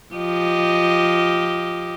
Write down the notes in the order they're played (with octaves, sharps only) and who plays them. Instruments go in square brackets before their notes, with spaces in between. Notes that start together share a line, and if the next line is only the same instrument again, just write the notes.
[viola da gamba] F3 G4 D#5